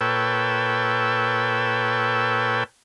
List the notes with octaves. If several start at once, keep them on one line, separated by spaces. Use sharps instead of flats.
A#2 A4 B4 C#5 G5 E6